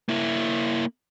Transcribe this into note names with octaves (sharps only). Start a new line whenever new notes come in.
A#3 E4